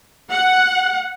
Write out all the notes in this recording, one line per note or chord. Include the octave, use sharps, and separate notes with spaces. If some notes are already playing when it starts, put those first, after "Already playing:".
F#5